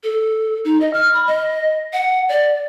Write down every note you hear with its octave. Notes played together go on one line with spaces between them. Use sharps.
A4
D#4
D#5
F6
B5
D#5
F#5
D5